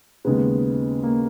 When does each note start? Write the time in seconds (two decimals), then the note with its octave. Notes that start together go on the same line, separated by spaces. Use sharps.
0.25 D#2 C#3 G#3 B3
1.03 A#3